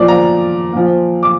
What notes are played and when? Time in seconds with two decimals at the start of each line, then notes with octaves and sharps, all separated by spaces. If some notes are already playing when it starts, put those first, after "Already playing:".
Already playing: A#2 F3 D5
0.08 A#5
0.73 A#2 F3
1.23 D6